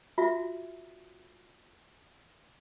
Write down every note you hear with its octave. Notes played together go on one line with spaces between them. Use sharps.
F4 F#4 E5